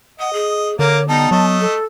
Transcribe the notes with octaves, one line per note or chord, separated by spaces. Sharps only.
D#5 F#5
G#4
D3 A#3 A#4 C#5 D6
G3 B3 D#4 A5
F#3 A3 D#5
A4